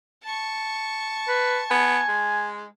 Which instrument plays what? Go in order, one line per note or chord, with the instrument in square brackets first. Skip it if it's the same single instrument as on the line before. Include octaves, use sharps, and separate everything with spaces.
[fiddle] A5 C#6
[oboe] B4
[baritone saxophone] B3 [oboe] G#5
[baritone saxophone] G#3